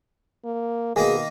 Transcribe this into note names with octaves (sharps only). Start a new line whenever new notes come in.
A#3
B2 D#3 A#3 D#4 G#4